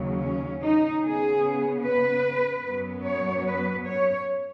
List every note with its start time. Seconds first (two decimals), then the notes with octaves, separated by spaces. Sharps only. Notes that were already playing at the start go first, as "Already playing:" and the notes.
Already playing: D#2 C#3 F#3
0.21 C#4
0.62 D#4
1.03 C#3 B3 G#4
1.84 B4
2.66 F#2 F#3 B3
3.06 C#5
3.47 B4
3.87 C#5